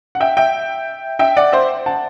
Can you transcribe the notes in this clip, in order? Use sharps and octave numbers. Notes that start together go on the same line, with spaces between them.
F#5
E5 G5
E5 G5
E5 G5
D5 F#5
C5 E5
F#5 A5